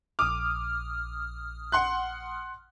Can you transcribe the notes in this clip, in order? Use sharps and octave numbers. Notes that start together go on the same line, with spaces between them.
A#1 D6 D#6 F6
F#5 C6 F#6